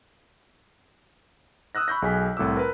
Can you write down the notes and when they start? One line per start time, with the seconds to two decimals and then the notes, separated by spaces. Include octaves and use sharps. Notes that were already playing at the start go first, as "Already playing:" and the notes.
1.75 D#6 E6 F#6 A#6
1.88 B5 C#6 G6 A#6
2.02 B1 G#4 G#5 B6
2.37 C2 A2 D6 E6
2.57 A#4 B4